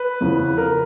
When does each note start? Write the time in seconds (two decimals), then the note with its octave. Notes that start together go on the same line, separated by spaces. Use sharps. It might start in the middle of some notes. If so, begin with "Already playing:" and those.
Already playing: B4
0.21 E2 C#3 F3
0.58 A#4